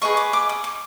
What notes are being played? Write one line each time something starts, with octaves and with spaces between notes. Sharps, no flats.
G#4 B4 D#5 C#6
D6
D6
D#6
D6